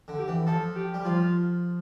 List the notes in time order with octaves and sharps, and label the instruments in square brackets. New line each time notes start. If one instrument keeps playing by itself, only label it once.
[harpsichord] D3
[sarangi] G4
[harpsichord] E3
[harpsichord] F3 [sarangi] A4
[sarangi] G4
[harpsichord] G3
[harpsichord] F3 [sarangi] F4